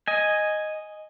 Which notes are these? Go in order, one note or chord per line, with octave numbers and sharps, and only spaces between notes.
D#5 G#5